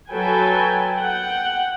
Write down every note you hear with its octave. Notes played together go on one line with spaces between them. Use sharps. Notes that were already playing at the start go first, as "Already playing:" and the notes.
F#3 A4 B4 G5 G#5
F#5 G5